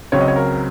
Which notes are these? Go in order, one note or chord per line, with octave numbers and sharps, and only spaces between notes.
C#2 C#3 F#3 C4 C#5
D#5
C#5
A#4